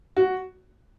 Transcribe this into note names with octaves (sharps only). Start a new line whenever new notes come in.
F#4